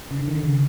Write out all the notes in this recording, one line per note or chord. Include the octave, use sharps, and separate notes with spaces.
C#3
D3
D#3
D3
C#3